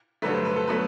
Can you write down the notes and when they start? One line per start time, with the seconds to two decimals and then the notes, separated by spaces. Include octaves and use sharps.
0.22 G2 D3 F#3 A3 B4
0.34 C5
0.45 B4
0.56 A4
0.67 B2 F#3 A3 B4